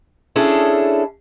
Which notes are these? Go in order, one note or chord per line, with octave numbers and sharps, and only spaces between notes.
C#4 D4 E4 G#4 A4